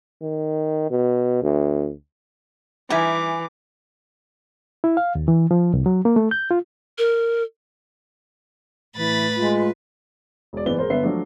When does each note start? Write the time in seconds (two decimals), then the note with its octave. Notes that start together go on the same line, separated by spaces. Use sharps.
0.21 D#3
0.90 B2
1.43 D2
2.90 E3 G3 D#4 E5 G#5 D6
4.84 E4
4.97 F5
5.15 D#2
5.28 E3
5.51 F3
5.74 C2
5.86 F#3
6.05 A#3
6.16 A3
6.31 G6
6.51 F4
6.98 A#4
8.97 A2 E3 B4 B5 A6
9.37 G#3 F4
10.53 E1 D5
10.66 F#1 G#2 E3 B3 D5 G7
10.79 E1 G#3 A#4 C5
10.90 G1 D3 B3 B4 E5 C7
11.03 F3 F#3 A3 D4